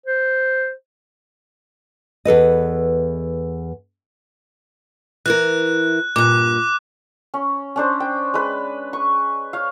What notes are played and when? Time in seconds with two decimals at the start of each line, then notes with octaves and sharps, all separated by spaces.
0.06 C5
2.25 E2 A4 B4 D#5
5.26 E3 E4 A#4 F#6
6.16 G2 A#2 D6 F#6
7.34 C#4
7.76 C#4 D4 C5
8.00 G5
8.34 G#3 B4
8.93 C#6
9.53 C#5 F5